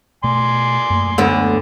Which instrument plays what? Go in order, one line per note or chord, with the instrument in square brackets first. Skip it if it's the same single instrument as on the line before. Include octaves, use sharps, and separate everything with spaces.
[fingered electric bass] B2 A3 [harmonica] D5 G#5 C6
[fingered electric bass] F#2 A3 A#3
[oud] D2 D3 B3